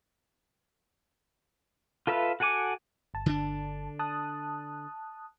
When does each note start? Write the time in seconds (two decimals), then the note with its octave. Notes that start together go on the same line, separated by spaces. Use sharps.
2.07 F4 A4 B4 E5 F5
2.40 F#4 A4 F#5 G#5 D6
3.14 G1 A5
3.26 D3 D4
3.99 A5 D#6 F#6